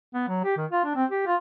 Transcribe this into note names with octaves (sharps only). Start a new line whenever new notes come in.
B3
F#3
G4
D#3
F4
D4
C4
G4
F4